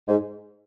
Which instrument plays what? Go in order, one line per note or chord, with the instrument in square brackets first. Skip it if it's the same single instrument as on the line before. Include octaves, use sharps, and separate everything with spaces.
[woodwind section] G#2